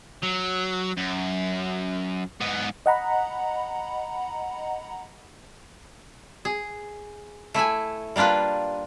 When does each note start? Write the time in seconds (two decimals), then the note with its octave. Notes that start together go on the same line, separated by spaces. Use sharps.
0.23 F#3
0.97 F#2
2.41 G#2 B3
2.86 D#5 F#5 A#5 B5
6.45 G#4
7.54 A3 E4 E5 G#5
8.16 G3 A#3 D4 F4 B4